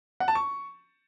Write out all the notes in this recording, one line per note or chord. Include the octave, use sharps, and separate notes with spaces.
F#5
A5
C#6